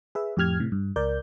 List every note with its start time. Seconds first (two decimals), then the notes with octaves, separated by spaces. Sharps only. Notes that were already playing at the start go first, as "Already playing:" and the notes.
0.15 G#4 B4 E5
0.37 F2 A2 G4 F6 G#6
0.60 A2 C3
0.72 G2
0.96 C#2 A#4 D5 G6